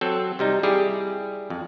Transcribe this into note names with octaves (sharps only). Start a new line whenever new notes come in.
F#3 C4 A4
C3 G3 D#4
G3 E4 G4 G#4
F2